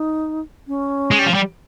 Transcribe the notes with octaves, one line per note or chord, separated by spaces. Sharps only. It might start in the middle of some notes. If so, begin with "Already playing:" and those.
Already playing: D#4
C#4
G#3
G3
F3
G3